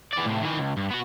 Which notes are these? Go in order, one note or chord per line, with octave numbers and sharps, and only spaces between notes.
E3 D5
A2 C3
D#3 E3
C#2
G2
B3 F#4